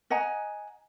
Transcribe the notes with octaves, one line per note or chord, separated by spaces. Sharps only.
D#5 F#5 G#5 A#5